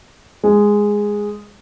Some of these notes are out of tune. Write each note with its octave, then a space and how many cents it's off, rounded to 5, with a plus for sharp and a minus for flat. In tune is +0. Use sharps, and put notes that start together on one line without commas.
G#3 -5